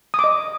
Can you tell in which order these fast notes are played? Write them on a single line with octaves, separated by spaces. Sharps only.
D#6 D6 D#5